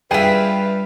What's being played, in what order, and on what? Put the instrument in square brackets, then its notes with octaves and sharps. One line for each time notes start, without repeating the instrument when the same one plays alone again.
[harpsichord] G2 G3 [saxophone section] F4 B4 [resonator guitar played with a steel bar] G#4 E5 [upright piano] G5